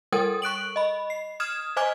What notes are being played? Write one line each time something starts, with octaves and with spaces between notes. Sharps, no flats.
G3 A4 A#4 G5 D#6
C#6 F#6 D7 F#7
D#5 B5
C7
D#6 F6 G#6 E7
C5 D#5 G#5 D6 F6 G#6